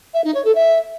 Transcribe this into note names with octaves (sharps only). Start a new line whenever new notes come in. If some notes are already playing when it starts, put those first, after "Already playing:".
E5
D#4
C#5
A4
E5